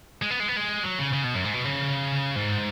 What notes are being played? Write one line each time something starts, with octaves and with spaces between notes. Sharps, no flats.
G#3
B3
G#3
B3
G#3
F#3
C#3
C#3
B2
F#2
G#2
B2
C#3
G#2